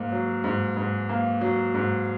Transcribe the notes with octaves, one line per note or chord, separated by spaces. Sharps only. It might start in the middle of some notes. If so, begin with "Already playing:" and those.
Already playing: G#2 A#3
F#3
G#2
G#2
A#3
F#3
G#2